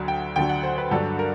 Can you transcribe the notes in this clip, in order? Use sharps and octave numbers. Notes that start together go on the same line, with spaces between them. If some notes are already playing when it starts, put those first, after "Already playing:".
Already playing: D2 D3 F#3
G5
D2 D3 F#3 G5
F#5
C5
B4
G2 D3 F#3 A4
A#4